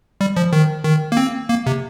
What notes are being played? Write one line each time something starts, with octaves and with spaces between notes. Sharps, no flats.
G3
F3
D#3
D#3
A#3
C4
A#3
C3